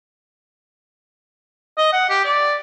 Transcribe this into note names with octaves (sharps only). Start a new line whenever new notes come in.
D#5
F#5
G4
D5